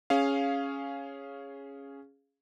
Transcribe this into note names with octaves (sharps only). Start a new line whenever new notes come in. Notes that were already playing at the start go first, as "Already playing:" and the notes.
C#4 G#4 F5